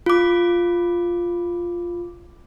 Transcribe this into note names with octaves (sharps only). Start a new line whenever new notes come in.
F4 D6